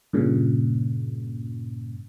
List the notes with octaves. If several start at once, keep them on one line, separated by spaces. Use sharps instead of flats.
G2 A#2 C#3